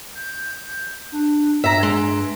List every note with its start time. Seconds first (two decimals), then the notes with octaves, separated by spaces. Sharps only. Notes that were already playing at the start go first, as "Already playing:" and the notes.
0.15 G6
1.12 D4
1.64 G2 E5 A#5
1.83 G#3